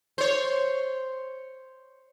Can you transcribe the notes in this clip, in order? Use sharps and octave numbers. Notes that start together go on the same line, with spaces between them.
C5 C#5